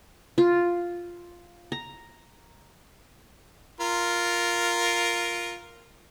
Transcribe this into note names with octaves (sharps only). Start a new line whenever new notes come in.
F4
A#5
F4 A#4